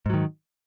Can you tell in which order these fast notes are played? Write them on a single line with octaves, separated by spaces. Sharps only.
G#2 F#3 D#3